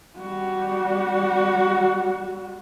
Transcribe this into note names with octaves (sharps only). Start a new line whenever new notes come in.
G3 F#4